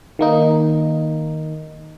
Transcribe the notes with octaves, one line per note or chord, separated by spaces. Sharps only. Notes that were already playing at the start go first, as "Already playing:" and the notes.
D#3 A#3 D#4